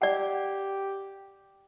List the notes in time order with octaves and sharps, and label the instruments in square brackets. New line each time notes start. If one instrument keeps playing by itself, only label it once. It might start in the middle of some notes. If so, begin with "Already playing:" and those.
[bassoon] G4 [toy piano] D5 F#5